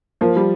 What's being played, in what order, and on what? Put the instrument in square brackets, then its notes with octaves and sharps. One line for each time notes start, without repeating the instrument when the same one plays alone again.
[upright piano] F3 [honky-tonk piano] A#3
[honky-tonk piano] G3